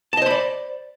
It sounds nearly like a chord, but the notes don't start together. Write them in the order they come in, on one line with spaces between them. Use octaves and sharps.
A5 D#5 C5 B5 D5